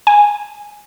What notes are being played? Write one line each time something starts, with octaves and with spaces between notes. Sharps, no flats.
G#5